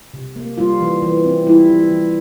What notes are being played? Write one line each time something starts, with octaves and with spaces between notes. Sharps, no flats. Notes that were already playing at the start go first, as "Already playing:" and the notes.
C3
A#3
G3 F4
E3
E3
C4
G3 E4
E3
E3